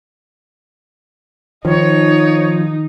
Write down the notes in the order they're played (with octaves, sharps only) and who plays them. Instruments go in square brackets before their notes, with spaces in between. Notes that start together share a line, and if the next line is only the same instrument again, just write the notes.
[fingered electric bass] D#3 [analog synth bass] F3 [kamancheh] D#4 [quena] C#5